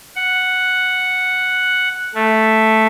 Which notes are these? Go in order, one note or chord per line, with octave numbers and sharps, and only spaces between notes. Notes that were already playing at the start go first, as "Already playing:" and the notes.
F#5
A3